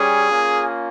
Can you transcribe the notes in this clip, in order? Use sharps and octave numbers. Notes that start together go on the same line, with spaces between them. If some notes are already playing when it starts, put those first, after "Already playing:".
Already playing: G3 C#4 G#4
A#3 C#4 F4